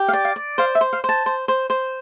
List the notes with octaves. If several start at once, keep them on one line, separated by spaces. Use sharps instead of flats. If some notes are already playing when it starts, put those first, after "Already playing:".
Already playing: G4
F5
D5
F5
D5
C5 F5
E5
C5
F5
C5 A5
C5
C5
C5